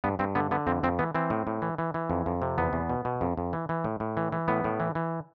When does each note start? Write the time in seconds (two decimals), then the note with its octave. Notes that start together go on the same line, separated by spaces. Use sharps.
0.04 G2 B3
0.19 G2 C4
0.35 D3 B3
0.51 D3 B3
0.67 F2 C4
0.83 F2 C4
0.99 E3 B3
1.15 E3 C4
1.30 A2
1.47 A2
1.62 E3
1.78 E3
1.94 E3
2.10 F2
2.26 F2
2.42 C3
2.58 E2 B3
2.73 E2
2.89 B2
3.05 B2
3.21 F2
3.37 F2
3.53 E3
3.69 E3
3.84 A2
4.00 A2
4.17 E3
4.32 E3
4.48 A2 B3
4.64 A2
4.80 E3
4.95 E3